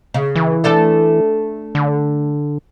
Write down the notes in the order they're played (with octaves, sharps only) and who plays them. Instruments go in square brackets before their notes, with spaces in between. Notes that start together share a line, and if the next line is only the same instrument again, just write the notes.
[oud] C#3
[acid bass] E3
[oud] A3 D4 A4
[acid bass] D3